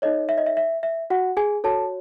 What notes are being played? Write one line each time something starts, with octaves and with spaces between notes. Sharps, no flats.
D#4 A4 C#5 D#5
E5
D#5
E5
E5
E5
F#4 F#5
G#4 G#5
F#4 A4 C#5 A5